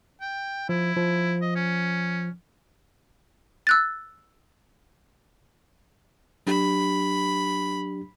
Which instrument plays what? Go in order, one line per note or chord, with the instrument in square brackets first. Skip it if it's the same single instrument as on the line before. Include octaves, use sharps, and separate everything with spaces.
[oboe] G5
[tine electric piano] F3 [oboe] E4
[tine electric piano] F3
[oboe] D#5
C#4
[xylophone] E6 F#6 A6
[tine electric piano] F#3 D4 G4 [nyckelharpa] B5